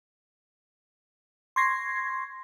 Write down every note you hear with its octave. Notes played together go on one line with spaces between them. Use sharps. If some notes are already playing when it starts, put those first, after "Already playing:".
C6 C#6 G#6 A#6 C7